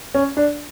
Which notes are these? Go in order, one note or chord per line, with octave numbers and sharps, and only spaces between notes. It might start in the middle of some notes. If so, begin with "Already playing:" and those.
C#4
D4